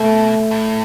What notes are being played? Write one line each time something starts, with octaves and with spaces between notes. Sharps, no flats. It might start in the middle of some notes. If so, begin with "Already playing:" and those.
Already playing: B2 A3
A2